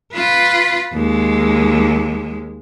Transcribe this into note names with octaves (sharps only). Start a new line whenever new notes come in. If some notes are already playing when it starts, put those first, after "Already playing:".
F4 B4
D#2 G#3